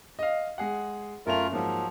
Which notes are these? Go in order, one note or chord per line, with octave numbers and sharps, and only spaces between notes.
D#5 F5
G#3 G#4 F#5
F#2 A3 C#4 F4 A#4 F7
G#2 F3 F#3 A#3